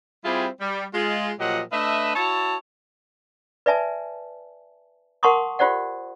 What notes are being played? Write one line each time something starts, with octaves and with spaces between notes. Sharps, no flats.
G3 C4 E4 F4 G4 G#4
G3
G#3 F4
A#2 F3 F#3 G4 D#5 F#5
A3 D4 B4 D#5 E5
E4 F#4 C#5 A5
B4 D5 E5 G#5 A5
A#4 F#5 A5 C6 C#6 D#6
F4 G4 C5 D5 F#5